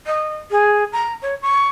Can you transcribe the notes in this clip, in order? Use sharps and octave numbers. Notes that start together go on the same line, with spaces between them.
D#5
G#4
A#5
C#5
C#6